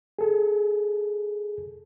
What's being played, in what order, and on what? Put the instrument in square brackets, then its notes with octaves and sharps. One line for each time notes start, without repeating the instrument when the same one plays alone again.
[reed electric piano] G#4 A4